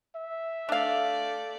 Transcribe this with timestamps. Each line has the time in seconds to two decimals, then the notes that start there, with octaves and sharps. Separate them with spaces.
0.16 E5
0.69 A3 D4 D5 F5